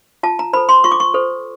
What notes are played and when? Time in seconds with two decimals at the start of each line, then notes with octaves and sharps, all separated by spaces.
0.23 F4 A5
0.39 A#5
0.53 C5 B5
0.56 A4
0.69 C6
0.84 F4 C#6
0.92 D6
1.00 C#6
1.14 A4 C5